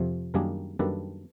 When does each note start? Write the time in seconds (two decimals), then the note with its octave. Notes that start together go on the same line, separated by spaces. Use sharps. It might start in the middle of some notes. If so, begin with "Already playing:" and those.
Already playing: F2 C3 F3
0.34 F#2 D#3 G3 A#3 D4 G#4 A#4
0.79 F#2 D#3 G3 A#3 D4 A4 B4